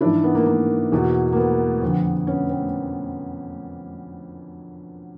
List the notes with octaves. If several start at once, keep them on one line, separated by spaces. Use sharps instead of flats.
G#2 E3 D4 E4
B3
A#3
A#3
E2 B2
A#3
B3
F2 D3
B3 C#4
C4